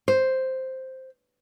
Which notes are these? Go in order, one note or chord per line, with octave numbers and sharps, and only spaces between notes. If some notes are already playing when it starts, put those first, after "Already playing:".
C5